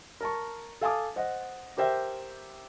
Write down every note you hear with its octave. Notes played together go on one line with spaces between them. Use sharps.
A#4 A5 C#6
A4 F5 G#5 A5 D6 D#6
C5 D#5 F#5
G4 A#4 C5 E5 G5